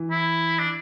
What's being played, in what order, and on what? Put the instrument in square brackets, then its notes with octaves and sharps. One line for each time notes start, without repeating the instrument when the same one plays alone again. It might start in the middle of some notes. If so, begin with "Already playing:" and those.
Already playing: [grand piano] E3
[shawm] E4
D4